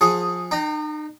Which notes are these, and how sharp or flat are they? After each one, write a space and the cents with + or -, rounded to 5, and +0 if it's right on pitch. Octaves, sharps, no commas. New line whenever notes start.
F3 +25 G#4 +0 F#5 -10
D#4 -40 G5 -10 A#5 +0